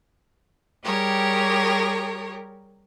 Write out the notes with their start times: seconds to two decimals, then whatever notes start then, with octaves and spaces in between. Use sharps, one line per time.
0.83 G3 G4 G#4 A#4 C#5